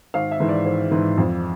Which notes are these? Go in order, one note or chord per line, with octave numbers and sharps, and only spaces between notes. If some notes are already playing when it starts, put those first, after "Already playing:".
G#1 F5
E5
G#2 E3
D5
G#1
G#2 E3
F2